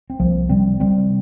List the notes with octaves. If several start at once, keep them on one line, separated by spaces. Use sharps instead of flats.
C4
C2 F3 A#3
C3 G3 C4
C3 G3 C4